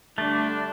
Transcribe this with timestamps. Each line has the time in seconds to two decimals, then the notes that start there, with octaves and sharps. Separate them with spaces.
0.18 D3 G3 A3 D4